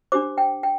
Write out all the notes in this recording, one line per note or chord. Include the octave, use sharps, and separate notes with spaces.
D4 G4 C5 D6
G5
G5